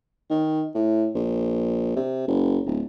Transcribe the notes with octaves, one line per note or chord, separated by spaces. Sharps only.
D#3
A2
A#1
C3
F#1
D1